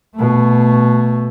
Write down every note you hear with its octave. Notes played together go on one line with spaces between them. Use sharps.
B2 A3